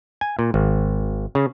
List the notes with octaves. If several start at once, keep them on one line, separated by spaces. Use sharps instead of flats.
G#5
A#2
G#1
C#3